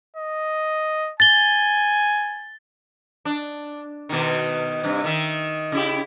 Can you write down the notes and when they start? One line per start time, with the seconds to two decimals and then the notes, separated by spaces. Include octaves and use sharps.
0.16 D#5
1.20 G#5 A6 G7
3.25 D4
4.09 B2 D#3
4.83 G2 C3
5.04 D#3 E5
5.72 C#3 E4 G4